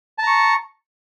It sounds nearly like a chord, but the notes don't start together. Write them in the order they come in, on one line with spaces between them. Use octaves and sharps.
A5 A#5 C#6